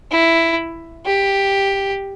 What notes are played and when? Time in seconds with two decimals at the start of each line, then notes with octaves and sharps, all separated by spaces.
0.11 E4
1.06 G4